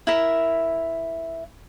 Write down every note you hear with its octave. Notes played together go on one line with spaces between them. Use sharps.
E4 A#4 E5